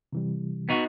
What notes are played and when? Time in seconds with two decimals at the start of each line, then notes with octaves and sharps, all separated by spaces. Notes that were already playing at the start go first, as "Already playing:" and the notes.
0.13 C3 E3 G3
0.69 B3 D#4 F#4